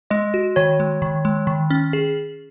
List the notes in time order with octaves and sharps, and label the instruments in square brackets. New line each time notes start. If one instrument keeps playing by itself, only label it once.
[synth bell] G#3 [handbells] D#5
[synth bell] F#4
[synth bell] D#3 [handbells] C#5
[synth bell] G#3
D#3
G#3
D#3
C#4
G#4